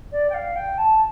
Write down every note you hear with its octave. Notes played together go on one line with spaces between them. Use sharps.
D5
G5
F5
G5
A5